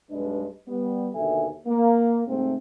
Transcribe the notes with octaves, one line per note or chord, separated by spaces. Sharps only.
B1 G2 G#3 D4 B4 D#5
G3 B3
D#2 B2 D3 A4 E5 G#5
A#3
G#2 C3 A3 C4